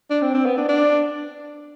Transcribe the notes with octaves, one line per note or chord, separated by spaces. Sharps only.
D4
C4
C4
B3
D4
D4